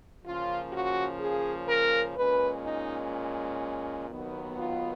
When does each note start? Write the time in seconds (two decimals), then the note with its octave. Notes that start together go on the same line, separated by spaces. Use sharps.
0.25 C#3 F3 A#3 C#4 F4
0.73 F#4
1.20 G#4
1.69 A#4
2.16 A#2 G#3 C#4 B4
2.65 D#4
4.08 D#2 D#3 F#3 B3
4.57 F4